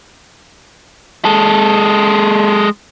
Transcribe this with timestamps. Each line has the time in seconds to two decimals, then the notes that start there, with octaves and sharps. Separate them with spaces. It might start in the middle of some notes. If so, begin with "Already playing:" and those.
1.25 G#3 A4